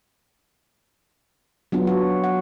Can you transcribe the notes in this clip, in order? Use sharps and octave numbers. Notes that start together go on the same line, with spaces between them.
F#3 B3 D4 F4
F#4
F#5